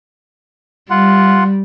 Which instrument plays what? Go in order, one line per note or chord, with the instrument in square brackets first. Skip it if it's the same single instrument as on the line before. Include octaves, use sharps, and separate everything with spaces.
[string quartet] G3 [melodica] F4 F#5